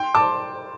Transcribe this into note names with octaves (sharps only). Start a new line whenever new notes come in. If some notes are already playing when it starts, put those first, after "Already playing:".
Already playing: G5 C6
A5 D6